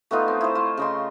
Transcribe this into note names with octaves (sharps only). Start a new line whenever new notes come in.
A3 B3 D#4 F4
C4
E4 C5
F4 C5
C#3 D#5 C6